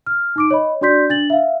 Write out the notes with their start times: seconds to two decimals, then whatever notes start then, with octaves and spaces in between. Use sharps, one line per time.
0.07 F6
0.36 D#4 D6 D7
0.51 C#5 D#5 B5
0.81 D4 F#4 D5 C6 G6 B6
1.09 D4 A6 F#7
1.30 E5 F5